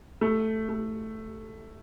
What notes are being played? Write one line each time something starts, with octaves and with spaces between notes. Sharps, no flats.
A3
A3